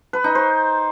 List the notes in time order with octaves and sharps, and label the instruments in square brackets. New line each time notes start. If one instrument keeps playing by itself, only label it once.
[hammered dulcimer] B4
D#4
C5